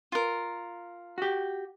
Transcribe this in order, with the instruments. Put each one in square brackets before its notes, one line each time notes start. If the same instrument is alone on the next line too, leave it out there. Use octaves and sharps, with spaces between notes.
[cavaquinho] F4 A#4
[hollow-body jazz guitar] F#4 G4